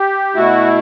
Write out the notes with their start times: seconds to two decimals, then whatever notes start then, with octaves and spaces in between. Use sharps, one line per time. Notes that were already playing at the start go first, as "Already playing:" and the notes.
Already playing: G4
0.35 B2 A3 E4 F#4